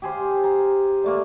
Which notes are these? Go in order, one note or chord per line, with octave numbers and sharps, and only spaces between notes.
G4 G#4 C5 F5
A#5
D3 A3 A#3